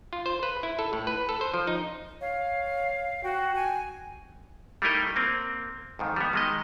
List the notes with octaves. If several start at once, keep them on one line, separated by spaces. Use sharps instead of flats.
F4
C5
B4
E4
A4
A2
B4
A4
C5
F3
D#4
C#5 F5
F#4 G5
G#5
G3 A3 D#4 E4 A#4 D#5
A#3 C4
F2 G#2 D#3
G3 B3
D#3 G#3 D#5